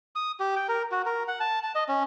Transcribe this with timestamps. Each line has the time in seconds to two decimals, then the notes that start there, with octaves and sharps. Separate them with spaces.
0.15 D#6
0.40 G4
0.56 G5
0.69 A#4
0.92 F#4
1.06 A#4
1.28 F#5
1.40 A5
1.63 A5
1.75 D#5
1.89 C#4